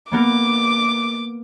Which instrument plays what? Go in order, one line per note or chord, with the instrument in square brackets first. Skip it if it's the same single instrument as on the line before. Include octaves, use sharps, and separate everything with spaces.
[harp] A#3 B3 A#4 [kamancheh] D6